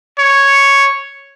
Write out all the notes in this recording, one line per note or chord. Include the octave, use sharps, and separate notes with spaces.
C#5